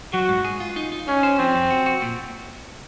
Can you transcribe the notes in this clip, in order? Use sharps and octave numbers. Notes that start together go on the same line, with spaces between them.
F#3 F#4
G#2
G#4
F4
D#4
D#4
C#4 G#4
C5
F3 C4
F2
F#4
F#4
A#2